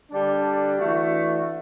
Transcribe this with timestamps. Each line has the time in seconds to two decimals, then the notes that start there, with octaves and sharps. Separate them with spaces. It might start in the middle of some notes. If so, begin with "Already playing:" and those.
0.10 D3 G3 D4
0.78 E3 A3 D4 F#4